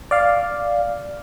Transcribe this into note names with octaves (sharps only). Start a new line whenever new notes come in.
D5 F5